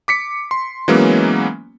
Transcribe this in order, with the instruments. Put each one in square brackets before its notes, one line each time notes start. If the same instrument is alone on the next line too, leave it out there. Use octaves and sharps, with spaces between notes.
[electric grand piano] D6 B6 C#7
C6
E3 F#3 G#3 A#3 B3 C#4